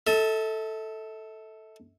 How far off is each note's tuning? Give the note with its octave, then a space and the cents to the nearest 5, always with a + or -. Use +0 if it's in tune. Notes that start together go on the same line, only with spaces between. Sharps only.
A4 +0 E5 -40